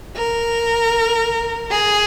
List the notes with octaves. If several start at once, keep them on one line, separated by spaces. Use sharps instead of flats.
A#4
G#4